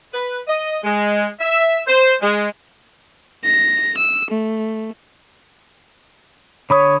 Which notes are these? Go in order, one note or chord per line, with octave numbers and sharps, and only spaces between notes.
B4
D#5
G#3
E5
C5
G#3
A#6
E6
A3
D3 C#5 B5 D#6